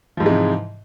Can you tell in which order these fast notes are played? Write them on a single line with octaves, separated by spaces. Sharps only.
F3 G#2 E3 G#3 C3